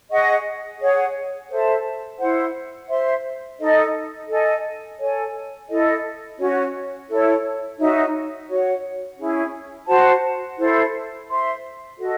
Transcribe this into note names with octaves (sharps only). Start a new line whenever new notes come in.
G#4 D#5 F#5 C#6
G#4 C#5 F#5
A4 C5 E5 A5
E4 C5 F#5
C5 E5 C6
D#4 A4 D#5
A4 D#5 G#5
A4 C#5 G#5
E4 A4 D#5
C#4 F#4 C#5
E4 A4 C#5
D#4 F#4 C#5 E5
F#4 C#5 F#5
C#4 E4 G#4
F#4 C5 F#5 A5
E4 A4 C5
C5 E5 C6
F#4 A4 D#5